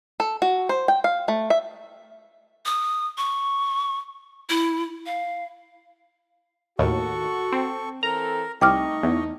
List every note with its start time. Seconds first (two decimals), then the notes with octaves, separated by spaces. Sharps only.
0.20 A4
0.42 F#4
0.69 C5
0.88 G5
1.04 F5
1.28 A3
1.50 E5
2.66 D#6
3.18 C#6
4.49 E4
5.06 F5
6.79 D#2 A2 F#4 A4 C#6
7.52 C4
8.03 E3 C4 A4 A#4 A#5
8.61 C2 A3 D#4 D#5 G5 C#6 D6 F6
9.03 E2